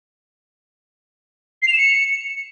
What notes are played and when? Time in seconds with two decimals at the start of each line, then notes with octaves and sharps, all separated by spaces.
1.62 C7
1.68 F7
1.73 E7
1.78 C#7